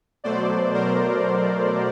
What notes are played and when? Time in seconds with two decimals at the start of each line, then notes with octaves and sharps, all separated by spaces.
0.24 B2 F#3 A3 C5 D5
0.74 A#4 C5